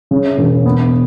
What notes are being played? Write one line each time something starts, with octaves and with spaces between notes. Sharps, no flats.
C#3
E1
B3